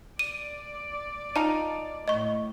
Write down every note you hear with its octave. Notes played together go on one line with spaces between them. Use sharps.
D5 D#7
D#4 F4 F5 A5
A2 D#5 C#6